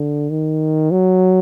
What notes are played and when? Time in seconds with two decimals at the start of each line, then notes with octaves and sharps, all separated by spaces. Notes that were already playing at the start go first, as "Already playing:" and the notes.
Already playing: D3
0.30 D#3
0.91 F#3